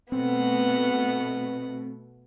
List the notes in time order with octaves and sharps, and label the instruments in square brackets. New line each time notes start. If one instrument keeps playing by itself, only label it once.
[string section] B2 A3 [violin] B3 F#5 [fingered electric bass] C4